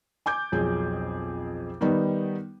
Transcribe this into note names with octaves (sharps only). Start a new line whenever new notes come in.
G#5 D6 G6
B1 F2 G#4
D#3 G3 B3 D#4